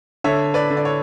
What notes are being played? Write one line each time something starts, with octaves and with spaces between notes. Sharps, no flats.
D3 C#5 E5
B4 D5
D3
D5
C#5